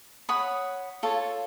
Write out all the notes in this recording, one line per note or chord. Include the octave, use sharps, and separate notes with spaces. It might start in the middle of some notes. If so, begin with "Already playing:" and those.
C#5 F#5 B5 D#6
F4 A4 C#5